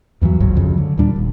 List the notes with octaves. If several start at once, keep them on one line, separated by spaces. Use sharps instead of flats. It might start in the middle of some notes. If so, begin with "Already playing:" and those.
E2 G2 E3 F#3
G1 C#2 G#2 F#3
F2 C#3 F#3
D3
D#2 A#2 G3 D4
D#1